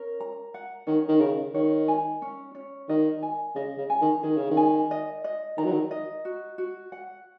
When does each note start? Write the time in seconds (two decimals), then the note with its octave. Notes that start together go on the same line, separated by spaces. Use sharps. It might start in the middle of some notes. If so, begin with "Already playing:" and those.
Already playing: C#4 A#4
0.20 A#5
0.54 F#5
0.87 D#3 C#4
1.09 D#3
1.21 C#3 A#4
1.54 D#3 C#5
1.88 G#5
2.22 C#4
2.55 C#4
2.89 D#3 D#5
3.23 G#5
3.55 C#3 D#5
3.78 C#3
3.90 G#5
4.01 D#3
4.23 D#3 G#4
4.37 C#3
4.51 D#3
4.57 G#5
4.91 D#5
5.24 D#5
5.58 D#3 A#5
5.65 F#3
5.72 D#3
5.91 D#5
6.25 F#4
6.58 F#4
6.92 F#5